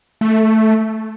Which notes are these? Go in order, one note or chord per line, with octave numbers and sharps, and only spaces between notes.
A3